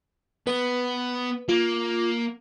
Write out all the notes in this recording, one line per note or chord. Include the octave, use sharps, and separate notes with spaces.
B3 B4
A#3 F4